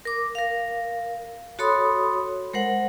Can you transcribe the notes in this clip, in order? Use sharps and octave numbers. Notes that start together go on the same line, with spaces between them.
A#4 D6
A#4 F5
F#4 A4 C#5 B5 C6 D#6
G#3 A#4 C5 F#5